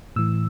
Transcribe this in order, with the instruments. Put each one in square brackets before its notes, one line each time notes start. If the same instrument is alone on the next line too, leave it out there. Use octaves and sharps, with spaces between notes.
[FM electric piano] A2 E3 E6